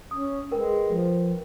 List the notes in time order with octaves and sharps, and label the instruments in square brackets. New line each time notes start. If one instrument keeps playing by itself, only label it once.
[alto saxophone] C#4 [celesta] D#6
[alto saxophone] G#3 [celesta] A#4 B4 G5
[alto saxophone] F3